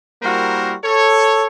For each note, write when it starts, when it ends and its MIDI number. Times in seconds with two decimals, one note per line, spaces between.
0.23 0.74 55
0.23 0.74 58
0.23 0.74 64
0.23 0.74 66
0.23 0.74 70
0.23 0.74 72
0.84 1.47 69
0.84 1.47 73